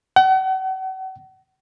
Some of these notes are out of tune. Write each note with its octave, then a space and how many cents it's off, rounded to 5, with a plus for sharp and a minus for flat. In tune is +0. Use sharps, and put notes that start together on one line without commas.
F#5 +40